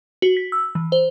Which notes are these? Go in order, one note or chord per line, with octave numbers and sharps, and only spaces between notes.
F#4
B6
E6
E3
C5